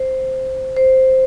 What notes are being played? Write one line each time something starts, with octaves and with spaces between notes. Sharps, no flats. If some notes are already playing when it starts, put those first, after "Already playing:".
Already playing: C5
C5